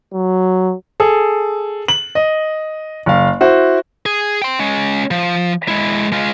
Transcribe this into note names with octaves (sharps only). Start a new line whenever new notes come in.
F#3
G#4 A4
F#7
D#5
F#1 F5
E4 F#4 C5
G#4
G5 C6
G#3 C#4
F3
G#3 E4
G#3 F4